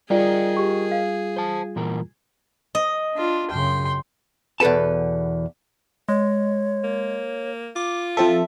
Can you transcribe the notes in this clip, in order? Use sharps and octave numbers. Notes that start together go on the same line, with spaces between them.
G3 F4 G#4 A#4 D5 D#5 G5
G4 C#6
F5
C5 A5
A#2 E3 A#4
D#5
D4 F4
F#2 C#3 G5 C6
E2 B2 A4 B4 A5
G#3 C#5
A#3
F4 D6
F3 C4 A4 E5